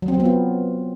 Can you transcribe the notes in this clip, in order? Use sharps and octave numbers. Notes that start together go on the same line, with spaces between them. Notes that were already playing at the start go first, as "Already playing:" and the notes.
F#3
C4
F#3
B3
F4